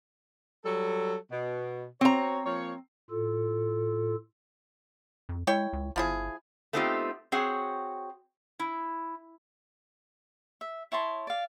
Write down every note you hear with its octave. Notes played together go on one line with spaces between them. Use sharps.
F#3 G3 A4
B2
C4 F#4 C5 C#5 A#5
F3 A#3 C#5
A2 F4 A4
F2
G#3 E4 C#5 G5
C#2
G1 F3 E4 G#4
A3 B3 C4 D#4 F4 G4
C4 F#4 G#4 C#5 F#5
E4
E5
E4 C#5 A5 C6
D5 F5